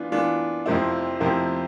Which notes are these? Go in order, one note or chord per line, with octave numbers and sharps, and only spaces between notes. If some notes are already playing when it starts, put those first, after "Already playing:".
Already playing: E3 B3 D4 F4
E3 B3 D4 F4
F2 C3 F3 C4 E4
F2 C3 F3 C4 E4